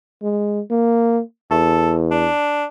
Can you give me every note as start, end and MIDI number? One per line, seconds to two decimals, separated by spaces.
0.22 0.60 56
0.70 1.21 58
1.51 2.27 40
1.51 1.95 69
2.11 2.66 62